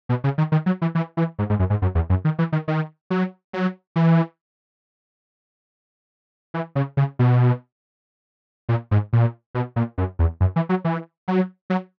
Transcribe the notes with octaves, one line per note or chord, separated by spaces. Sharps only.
B2
C#3
D#3
D#3
F#3
E3
E3
E3
G#2
G#2
F#2
G#2
F#2
E2
F#2
D#3
E3
D#3
D#3
F#3
F#3
E3
E3
C#3
C#3
B2
A#2
G#2
A#2
B2
A#2
F#2
E2
F#2
E3
F#3
E3
F#3
F#3